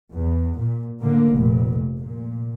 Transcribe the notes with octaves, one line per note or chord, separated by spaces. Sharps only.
E2
A#2
A2 D3 A#3
F1 A#2
A#2